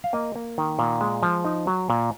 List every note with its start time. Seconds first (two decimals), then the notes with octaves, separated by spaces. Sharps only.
0.04 F5
0.13 A#3 D#5
0.36 A#3
0.58 D#3
0.79 A#2
1.01 G#3
1.23 F3
1.45 D#4
1.67 F#3
1.90 A#2